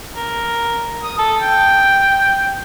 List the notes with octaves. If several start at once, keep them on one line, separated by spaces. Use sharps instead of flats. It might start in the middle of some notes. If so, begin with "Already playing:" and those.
A#4
D#6
A4
G5